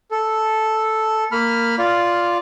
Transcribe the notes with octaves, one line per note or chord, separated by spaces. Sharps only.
A4
A#3 B5 F6
F4 D5 F5